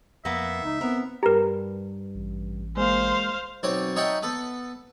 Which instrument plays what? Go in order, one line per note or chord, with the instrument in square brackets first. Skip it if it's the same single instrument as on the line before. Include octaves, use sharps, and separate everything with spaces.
[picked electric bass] F2 [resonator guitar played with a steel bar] A#3 B3 [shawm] E5
[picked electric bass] C#2 [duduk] D#4
[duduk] B3 [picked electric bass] C4 [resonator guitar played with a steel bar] A#4
[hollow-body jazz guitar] G2 B4 A#5 [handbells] G4 A#4
[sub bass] A1
[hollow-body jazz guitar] G#3 A#3 [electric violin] C5 F5
[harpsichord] B1 C4 C#5 D5
D#4 C#5 E5 F#5 G5 A5
B3 A4